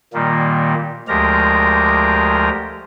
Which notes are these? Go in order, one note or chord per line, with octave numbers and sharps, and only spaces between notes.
A#2 D#3 G3 A#3
D2 F3 G#3 G4 A#4 A#5